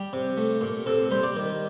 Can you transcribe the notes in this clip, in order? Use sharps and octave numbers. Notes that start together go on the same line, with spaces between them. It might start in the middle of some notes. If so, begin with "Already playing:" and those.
Already playing: G3 G4
C3
A3
A#2
C3 A4
G3 C5
D5
D#3